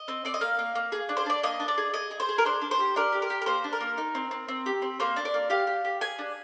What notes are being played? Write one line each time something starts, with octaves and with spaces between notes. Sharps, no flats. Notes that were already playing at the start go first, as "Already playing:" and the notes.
Already playing: D#5
C4
C4 D5
D#5
A#3 F5
A#3
A#3
G#4
D4
C5
D4 D5
A#3 D#5
D4
D5
G#4
G#4 D#5
G#4
C5
G#4
A#4
D4 C5
D4
C5
G4
D4 A#4
G4
A#4
G4
A#4
A#3 C5
D4
A#4
A#3
D#4
C4
C4
C4
G4
C4
A#3 C5
D4
D5
A#3
G4 F5
G4
G4
G#4 G#5
D4